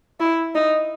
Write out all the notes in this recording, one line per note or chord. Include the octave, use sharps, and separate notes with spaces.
E4
D#4